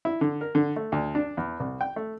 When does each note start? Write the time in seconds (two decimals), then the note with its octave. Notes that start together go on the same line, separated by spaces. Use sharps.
0.05 E4
0.21 D3
0.41 A#4
0.55 D3
0.76 A3
0.92 D2
1.15 D4
1.37 E2
1.60 C2
1.81 G5
1.96 A3